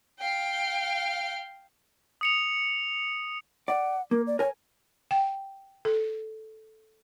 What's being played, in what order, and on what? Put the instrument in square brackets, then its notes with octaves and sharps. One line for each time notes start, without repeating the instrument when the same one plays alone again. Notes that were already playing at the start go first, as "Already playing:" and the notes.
[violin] F5 G5
[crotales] D#6 C#7 F7
[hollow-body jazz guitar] D5 [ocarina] F#5
[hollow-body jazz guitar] A#3 [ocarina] A#4
[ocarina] D5
[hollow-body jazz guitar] A#4 G#5 [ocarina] C#5
[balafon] G5
A4